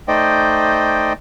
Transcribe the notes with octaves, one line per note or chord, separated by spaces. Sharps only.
A3 D#4 C5 D5 D#5 G5